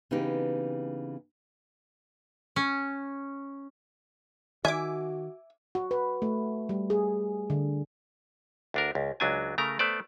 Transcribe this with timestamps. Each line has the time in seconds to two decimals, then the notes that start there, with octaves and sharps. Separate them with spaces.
0.11 C#3 E3 B3 C4 D#4 G4
2.56 C#4
4.65 D#3 F#4 E5 G#5 D6
5.75 F#4
5.91 B4
6.22 A3
6.69 G3
6.90 G#4
7.50 D3
8.74 D2 D4 A#4
8.95 C#2
9.20 C#2 F#3 D4 G#5
9.58 C#3 A3 A#4 A#5
9.79 A3 B3 C5 D5